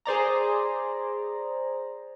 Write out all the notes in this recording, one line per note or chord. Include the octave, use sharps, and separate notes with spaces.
G#4 C5 D5 A#5